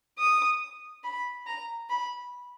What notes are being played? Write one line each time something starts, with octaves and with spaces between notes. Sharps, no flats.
D#6
B5
A#5
B5